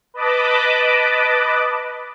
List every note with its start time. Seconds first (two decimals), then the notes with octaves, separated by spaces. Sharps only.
0.14 B4 D#5 A5 B5 D6